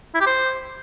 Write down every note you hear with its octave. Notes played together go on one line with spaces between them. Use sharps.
E4
G4
C5